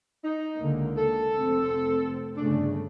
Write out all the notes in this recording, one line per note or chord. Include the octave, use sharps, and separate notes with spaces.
D#4
C#2 D3 A#3
A4
F1 C4
G1 C#3 A3 D4